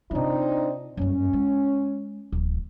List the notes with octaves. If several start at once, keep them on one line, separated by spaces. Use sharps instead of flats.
C3 C4 D4 D#4 F4
F#1 G2 C#4
G#3
D1 E3